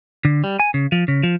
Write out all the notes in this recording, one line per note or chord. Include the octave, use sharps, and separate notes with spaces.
D3
G3
G#5
C#3
F3
C#3
F3